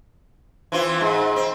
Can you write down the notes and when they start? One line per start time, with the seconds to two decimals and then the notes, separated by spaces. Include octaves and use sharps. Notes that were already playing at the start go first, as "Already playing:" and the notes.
0.72 E3 C4 F4
1.01 G#2
1.36 C4